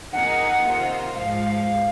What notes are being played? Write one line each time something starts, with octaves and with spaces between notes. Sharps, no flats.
F2 D#3 A#3 D#4 G#4 F#5
C3 D#3 A#3 F4 C5
G#2 F3 G#3 F5